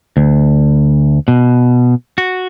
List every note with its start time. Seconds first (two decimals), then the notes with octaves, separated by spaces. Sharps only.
0.17 D2
1.28 B2
2.18 F#4